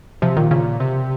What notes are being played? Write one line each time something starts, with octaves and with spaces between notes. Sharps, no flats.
C3 F3
A#2 D#3
A#2 C#3
C3